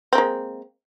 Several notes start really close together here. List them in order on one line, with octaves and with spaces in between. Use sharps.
C4 A#3 G#3